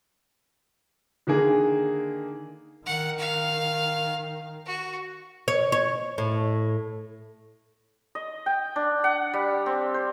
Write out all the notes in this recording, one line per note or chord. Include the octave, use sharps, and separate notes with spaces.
D3 D#3 A#3 G#4
D#3 F#5
F5
F#4
C#5
C#5
A2
D#5
G5
D4
F#5
G3
C4
C5